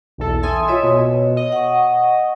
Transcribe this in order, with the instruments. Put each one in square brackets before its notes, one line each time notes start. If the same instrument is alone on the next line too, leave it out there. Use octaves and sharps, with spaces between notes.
[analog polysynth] B1 E2 A4
[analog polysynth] A4 G#5 [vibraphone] E5 C6 D#6
[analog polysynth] F4 E5 [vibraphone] C#5 D#5
[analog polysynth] B2
D#5
[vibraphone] F#5 C#6